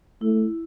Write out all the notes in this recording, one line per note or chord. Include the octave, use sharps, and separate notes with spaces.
A3 E4